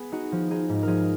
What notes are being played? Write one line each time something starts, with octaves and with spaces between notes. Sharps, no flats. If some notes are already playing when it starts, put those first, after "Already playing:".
Already playing: B3 G#4
D#4 F#4
F3
D#4 G#4
G#2
F3 G#4 A#4